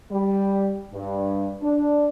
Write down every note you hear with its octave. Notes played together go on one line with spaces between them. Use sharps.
G3
G2
D4